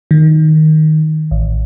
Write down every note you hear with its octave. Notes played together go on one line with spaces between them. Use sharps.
D#3
A1